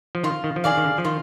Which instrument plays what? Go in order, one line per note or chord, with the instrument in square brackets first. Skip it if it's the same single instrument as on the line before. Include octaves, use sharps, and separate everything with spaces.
[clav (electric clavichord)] F3
[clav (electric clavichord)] D#3 [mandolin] F4
[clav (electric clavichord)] D#3
F3
[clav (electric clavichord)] D#3 [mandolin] G#4 D5 F5
[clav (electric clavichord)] D#3
D3
F3
[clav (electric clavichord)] D#3 [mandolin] F4